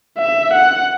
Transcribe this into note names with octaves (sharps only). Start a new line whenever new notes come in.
E5
F#5